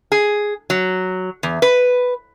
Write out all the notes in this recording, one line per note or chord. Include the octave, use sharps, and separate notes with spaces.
G#4
F#3
E2
B4